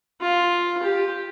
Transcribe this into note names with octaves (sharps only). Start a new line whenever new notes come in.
F4
G4